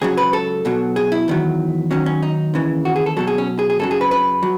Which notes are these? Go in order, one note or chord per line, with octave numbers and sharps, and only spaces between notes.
C#2 C#3 F#3 G#4
B4
A4
B1 B2 F#3
G#4
E4
E2 D#3 F#3
D#2 D#3 F#3 C#4
C#4
D#4
D#2 C#3 E3
F#4
G#4
A4
B1 B2 F#3 A4
G#4
C#4
G#4
G#4
F#2 C#3 F#3 A4
G#4
B4
B4
F#3